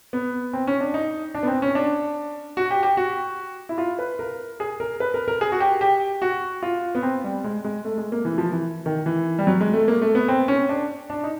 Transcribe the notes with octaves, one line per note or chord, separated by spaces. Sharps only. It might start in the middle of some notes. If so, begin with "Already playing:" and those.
B3
C4
C#4
D4
D#4
D4
B3
C4
C#4
D4
F#4
G4
G4
F#4
E4
F4
B4
A#4
G#4
A#4
B4
A#4
A#4
G#4
F#4
G4
G4
F#4
F4
B3
C4
G3
G#3
G#3
A3
G#3
A#3
E3
F3
E3
D#3
E3
G3
F#3
G#3
A3
A#3
A3
B3
C4
C#4
D4
D4
D#4